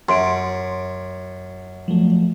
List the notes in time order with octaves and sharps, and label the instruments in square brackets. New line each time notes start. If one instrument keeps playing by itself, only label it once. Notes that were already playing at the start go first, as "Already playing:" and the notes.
[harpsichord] F#2 [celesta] C6 D7
[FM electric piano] F3 F#3 A3